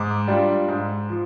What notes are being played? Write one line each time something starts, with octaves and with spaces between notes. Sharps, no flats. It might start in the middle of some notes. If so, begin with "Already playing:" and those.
Already playing: G#2 D6
G3 D4 F4
G#2
F3